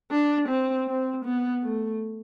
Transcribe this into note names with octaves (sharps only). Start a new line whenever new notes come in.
D4
C4
C4
B3
A3